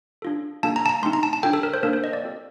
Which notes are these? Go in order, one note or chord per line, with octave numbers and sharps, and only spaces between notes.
D4 F4 A4
A#3 D4 F4 A4 A5
A#5
A5
A#5
A3 C4 D#4 C6
A#5
A5
A5
D4 F4 A4 G5
A4
A#4
C5
A#3 D4 A4 A#4
C5
D#5
D5
C4 F4 A4